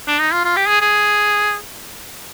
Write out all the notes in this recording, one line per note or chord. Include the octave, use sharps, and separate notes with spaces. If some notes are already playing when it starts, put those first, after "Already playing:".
D4
D#4
F4
F4
G4
G#4
G#4